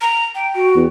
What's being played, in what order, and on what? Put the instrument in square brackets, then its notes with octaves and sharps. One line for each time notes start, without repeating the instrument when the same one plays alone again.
[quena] A#5
G5
[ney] F#4
[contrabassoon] E2